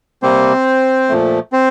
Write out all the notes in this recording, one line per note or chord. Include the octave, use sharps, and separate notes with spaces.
C3 G3 A#3 C4 C5
A#2 F3 A3
C4 C5